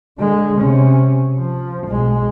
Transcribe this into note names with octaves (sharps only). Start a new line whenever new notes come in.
D3 G#3
C3 C#4
F3
B1 G#3